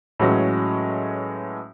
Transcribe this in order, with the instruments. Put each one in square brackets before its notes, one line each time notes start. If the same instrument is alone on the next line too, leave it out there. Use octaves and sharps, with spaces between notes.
[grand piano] A2 E3 F#3 G#3 C#4